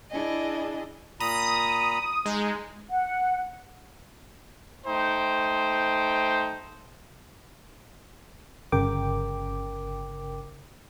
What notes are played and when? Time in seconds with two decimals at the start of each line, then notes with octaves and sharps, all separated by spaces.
0.10 D4 E4 G#4 D#5
1.20 A#2 A#5 B5 D#6
2.25 G#3 D#4
2.91 F#5
4.86 A3 D#4 C5 G5
8.72 G1 C#3 A#4 G5 D6